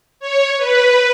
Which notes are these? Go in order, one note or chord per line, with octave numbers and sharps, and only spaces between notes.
C#5
B4